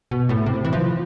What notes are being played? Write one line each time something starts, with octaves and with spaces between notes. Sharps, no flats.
B2
A2
C3
E3
F3